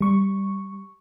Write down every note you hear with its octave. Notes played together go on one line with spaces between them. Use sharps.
G3 C#6